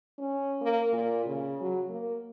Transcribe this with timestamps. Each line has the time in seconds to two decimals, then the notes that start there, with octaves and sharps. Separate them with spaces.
0.18 C#4
0.61 A#3
0.93 A#2
1.25 C#3
1.61 F#3
1.89 A#3